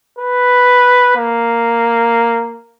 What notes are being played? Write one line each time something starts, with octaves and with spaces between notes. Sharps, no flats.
B4
A#3